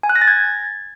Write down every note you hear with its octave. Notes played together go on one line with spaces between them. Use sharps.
G#5
F#6
A#6
A6
G#6